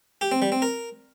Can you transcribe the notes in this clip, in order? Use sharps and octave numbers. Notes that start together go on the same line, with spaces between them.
G4
C4
G3
C4
A#4